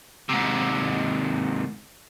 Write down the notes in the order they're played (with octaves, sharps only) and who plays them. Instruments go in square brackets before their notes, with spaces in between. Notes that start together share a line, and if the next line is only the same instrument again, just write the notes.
[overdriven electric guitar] G#2 C3